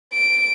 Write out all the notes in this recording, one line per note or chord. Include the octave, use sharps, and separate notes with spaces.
D7